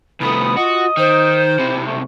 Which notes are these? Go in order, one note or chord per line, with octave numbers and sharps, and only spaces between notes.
C2 A3 B3 D#6
F4 F#4 D#5
D#3 C5
B1 C3 E4
A3